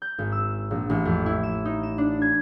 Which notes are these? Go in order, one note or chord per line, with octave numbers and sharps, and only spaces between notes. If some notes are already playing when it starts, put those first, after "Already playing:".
G6
G#1
E6
A#1
A1
F2
E4
E7
D#4
E7
D4
G#6